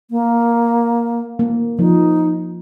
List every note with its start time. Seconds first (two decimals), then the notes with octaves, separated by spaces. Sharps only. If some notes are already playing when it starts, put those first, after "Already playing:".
0.11 A#3
1.39 A#3
1.79 F3 D#4